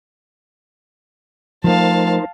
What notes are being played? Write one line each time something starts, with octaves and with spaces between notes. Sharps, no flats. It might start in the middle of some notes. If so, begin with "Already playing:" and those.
F3 A3 D#4 A#4 C5 F5 A5